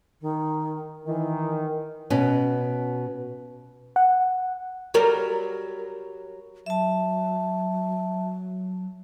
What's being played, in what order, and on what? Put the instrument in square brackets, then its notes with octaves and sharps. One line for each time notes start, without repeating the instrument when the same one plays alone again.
[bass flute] D#3
[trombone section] D#3 [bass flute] E3
[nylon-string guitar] B2 B3 C#4
[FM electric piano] F#5
[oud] F#3 G3 A#4
[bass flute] F#3 [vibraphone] E5 A5